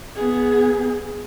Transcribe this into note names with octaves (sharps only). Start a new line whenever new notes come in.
B3 G#4